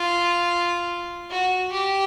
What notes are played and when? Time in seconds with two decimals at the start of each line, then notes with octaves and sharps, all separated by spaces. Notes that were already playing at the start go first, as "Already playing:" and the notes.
Already playing: F4
1.31 F#4
1.72 G4